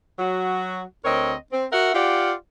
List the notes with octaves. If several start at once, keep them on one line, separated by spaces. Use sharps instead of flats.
F#3 F#4
D2 C4 A#4 C#5 D#5
C4
F#4 A#4 E5 F#5
F4 G4 D5 F5 F#5